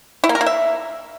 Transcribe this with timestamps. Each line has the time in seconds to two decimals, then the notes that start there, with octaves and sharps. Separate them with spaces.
0.24 E4
0.29 A#3
0.35 A#4
0.41 A#3
0.46 E5